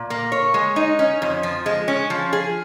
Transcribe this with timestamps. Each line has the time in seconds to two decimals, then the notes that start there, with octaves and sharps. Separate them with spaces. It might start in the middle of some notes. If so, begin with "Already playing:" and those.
Already playing: A#2
0.10 A#3
0.32 C#5
0.54 G#3
0.76 D#4
0.99 C#4
1.22 F2
1.43 F3
1.66 G#3
1.88 C#4
2.10 F3
2.33 G#4